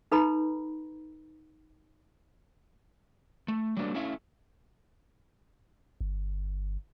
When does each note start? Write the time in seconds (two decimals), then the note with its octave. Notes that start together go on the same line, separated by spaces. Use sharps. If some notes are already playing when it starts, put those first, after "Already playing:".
0.12 D#4 A4 B4 A#5 B5
3.48 A3
3.77 F#3 G3 A3 A#3 D4 B4
3.94 A3 C#4 E4 A4 E5 F5
6.01 G1